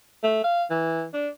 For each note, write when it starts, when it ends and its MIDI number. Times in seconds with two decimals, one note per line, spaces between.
0.23 0.42 57
0.44 0.64 77
0.70 1.06 52
1.14 1.29 62